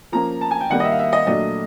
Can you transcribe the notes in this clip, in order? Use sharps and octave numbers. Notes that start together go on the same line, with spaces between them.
F3 A#3 C#4 A#5
A5
G#5
G5
D#3 G3 A#3 F#5
D#5
E5
F5
E5
D#5
A#2 F#3 A3 D4 D#5